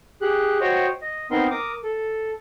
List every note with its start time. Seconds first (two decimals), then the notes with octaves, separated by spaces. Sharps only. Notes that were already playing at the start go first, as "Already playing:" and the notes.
0.22 G4 G#4 F#6
0.61 F#4 C5 C#5 D#5 G5
1.02 D#5
1.31 B3 C4 D#4 A#4 C6
1.51 A#4 D6 D#6
1.83 A4